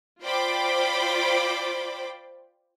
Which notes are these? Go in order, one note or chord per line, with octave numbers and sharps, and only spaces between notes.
F4 C5 D5 G5 B5 D6